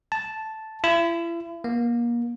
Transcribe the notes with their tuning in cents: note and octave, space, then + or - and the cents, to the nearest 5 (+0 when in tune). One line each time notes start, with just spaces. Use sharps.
A5 -5
E4 +40
A#3 +30